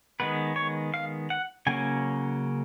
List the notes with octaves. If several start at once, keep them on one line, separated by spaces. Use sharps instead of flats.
D#3 G#3 B3 B4
C#5
F5
F#5
C#3 F#3 A#3 C#4 G#5